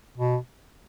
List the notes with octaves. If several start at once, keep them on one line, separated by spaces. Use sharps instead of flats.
B2